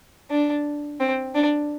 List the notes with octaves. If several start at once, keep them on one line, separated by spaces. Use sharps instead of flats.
D4
C4
D4